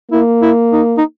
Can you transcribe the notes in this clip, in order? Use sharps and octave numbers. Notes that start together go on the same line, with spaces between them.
A#3 E4
E4
D#4
D#4